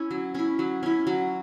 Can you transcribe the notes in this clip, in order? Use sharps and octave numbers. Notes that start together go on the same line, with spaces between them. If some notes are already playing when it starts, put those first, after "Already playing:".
Already playing: C#4 E4
F#3
C#4 E4
F#3
C#4 E4
F#3